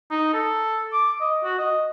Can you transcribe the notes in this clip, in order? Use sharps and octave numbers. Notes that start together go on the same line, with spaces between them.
D#4
A4
D6
D#5
F#4
D#5